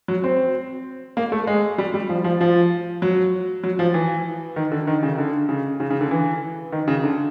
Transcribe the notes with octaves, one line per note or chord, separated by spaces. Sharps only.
F#3
C4
A#3
A3
G#3
G3
G3
F3
F3
F3
F#3
F#3
F3
E3
D#3
D3
D#3
C#3
D3
C#3
C#3
C#3
D3
E3
D#3
C#3
D3